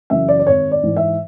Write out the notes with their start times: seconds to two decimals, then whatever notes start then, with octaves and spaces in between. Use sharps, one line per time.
0.10 F#2 C#3 E3 E5
0.28 D5
0.39 D5
0.47 G#1 C#5
0.72 D5
0.83 G#2 E3
0.96 E5